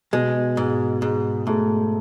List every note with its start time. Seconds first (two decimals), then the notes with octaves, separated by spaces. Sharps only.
0.13 B2 G#3
0.57 G#2
1.02 G#2
1.47 G#2 A3